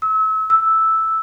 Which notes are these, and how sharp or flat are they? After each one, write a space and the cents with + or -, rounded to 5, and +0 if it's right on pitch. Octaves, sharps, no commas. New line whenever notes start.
E6 -35
E6 -5